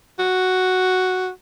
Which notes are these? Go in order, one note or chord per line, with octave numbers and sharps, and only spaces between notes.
F#4